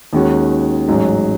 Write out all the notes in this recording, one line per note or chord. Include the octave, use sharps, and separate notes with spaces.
D#2 D#3 G#3 C#4 F#4
A1 G#2 F#3